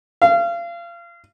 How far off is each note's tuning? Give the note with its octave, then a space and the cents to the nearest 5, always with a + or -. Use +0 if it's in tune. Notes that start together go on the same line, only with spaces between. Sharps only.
F5 -30